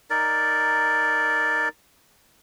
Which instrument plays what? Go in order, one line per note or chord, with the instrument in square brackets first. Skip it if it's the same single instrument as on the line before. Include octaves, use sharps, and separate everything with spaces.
[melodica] D#4 A#4 D5